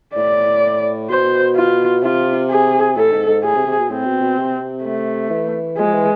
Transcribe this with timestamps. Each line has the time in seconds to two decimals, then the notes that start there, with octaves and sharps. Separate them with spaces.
0.16 A2 D5
1.10 B2 C5
1.56 F4
2.03 C3 F4
2.50 G#4
2.97 A2 A4
3.12 G#2
3.28 G#2
3.44 A2 G#4
3.55 C3
3.67 C3
3.79 B2
3.90 A2 C4
4.06 B2
4.21 B2
4.37 C3
4.84 A3
5.30 E3
5.77 F3 G#3
5.93 E3